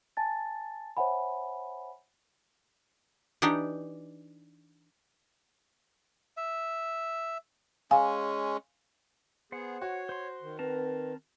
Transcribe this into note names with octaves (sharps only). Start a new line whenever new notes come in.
G#5 A5 A6
C5 C#5 E5 F#5 G#5 B5
E3 D4 D#4 G4
E5
G#3 C#4 F5 G#5
B3 G#4 C5 F#5
F#4 C#5
C5 C6
D#3
C4 A#4 B4 A5